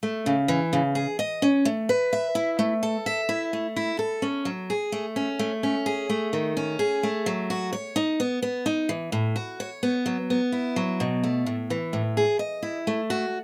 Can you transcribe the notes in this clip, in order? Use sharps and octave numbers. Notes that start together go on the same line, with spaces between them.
A3
C#3
E3
C#3
G#4
D#5
C#4
A3
B4
E5
E4
A3
A4
E5
E4
A3
E4
A4
C#4
F#3
G#4
A3
C#4
A3
C#4
G#4
A3
D#3
C#4
G#4
A3
F#3
F#4
C#5
D#4
B3
B3
D#4
E3
A2
F#4
C#5
B3
F#3
B3
E4
F#3
B2
A3
A2
E3
A2
G#4
D#5
E4
A3
F#4